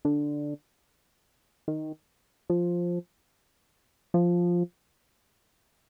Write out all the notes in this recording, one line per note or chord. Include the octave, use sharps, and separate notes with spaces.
D3
D#3
F3
F3